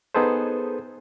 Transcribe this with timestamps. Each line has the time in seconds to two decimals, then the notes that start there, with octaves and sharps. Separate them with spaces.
0.15 B3 D#4 G#4 A4 B4 C5